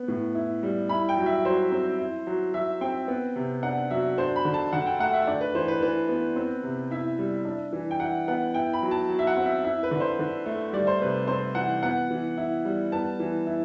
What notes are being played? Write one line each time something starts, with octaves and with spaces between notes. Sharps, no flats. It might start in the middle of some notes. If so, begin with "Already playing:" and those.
Already playing: B3
A2
E4
G3
E4 B5
G5
F#3
E5
F#3 C5
C4
E4
F#3
F#3 E5
C4 G5
B3
C3
D4 F#5
F#3 E5
D4 C5
B5
D3
A5
D3 F#5
G5
A3 F#5
E5
D4 D5
B4
E3 C5
B4
E3 B4
B3
C4
C3
E4 E5
G3
D4
E3
G5
E3 F#5
B3 F#5
E4 G5
B5
F#3
A5
F#3
E5
F#5
C4
E5
E4 E5
B4
D3
C5
D3
A3
G3 D5
C5
C3 B4
C4 C5
E3 F#5
B3 F#5
E3
E4
G3
B3 A5
E3
E4